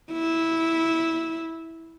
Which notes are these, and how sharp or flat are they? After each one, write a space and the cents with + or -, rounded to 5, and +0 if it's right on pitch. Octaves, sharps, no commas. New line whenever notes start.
E4 -10